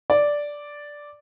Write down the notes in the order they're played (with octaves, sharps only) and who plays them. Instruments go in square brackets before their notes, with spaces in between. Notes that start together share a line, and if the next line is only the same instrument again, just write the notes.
[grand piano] D5